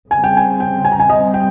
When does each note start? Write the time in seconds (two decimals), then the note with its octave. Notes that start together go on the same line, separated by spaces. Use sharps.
0.11 C#3 G3 C4 G#5
0.24 G5
0.37 G#5
0.60 G5
0.84 G#5
0.92 A#5
1.00 G#5
1.09 C3 G3 C4 D#5
1.34 G5